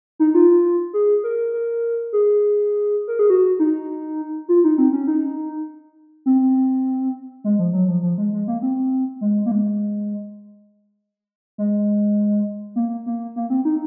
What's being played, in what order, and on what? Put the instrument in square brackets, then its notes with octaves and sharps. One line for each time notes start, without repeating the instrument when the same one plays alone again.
[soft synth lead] D#4
F4
G#4
A#4
A#4
G#4
A#4
G#4
F#4
D#4
F4
D#4
C4
C#4
D#4
C4
G#3
F3
F#3
F3
F3
G#3
G#3
A#3
C4
G#3
A#3
G#3
G#3
A#3
A#3
A#3
C4
D#4